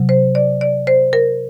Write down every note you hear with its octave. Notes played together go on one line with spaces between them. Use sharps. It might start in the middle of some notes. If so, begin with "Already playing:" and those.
Already playing: C3 F#3
C5
D5
D5
C5
A#4